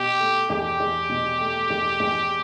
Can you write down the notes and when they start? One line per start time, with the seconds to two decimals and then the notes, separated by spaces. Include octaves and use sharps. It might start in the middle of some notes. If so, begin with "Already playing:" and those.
Already playing: B2 G4
0.20 A3
0.50 E2 G4
0.80 E2
1.10 B2
1.40 A3
1.70 E2
2.00 E2